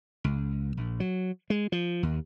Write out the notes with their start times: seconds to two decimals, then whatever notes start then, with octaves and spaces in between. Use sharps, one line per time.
0.24 C#2
0.77 A#1
1.00 F#3
1.50 G#3
1.72 F3
2.03 D#2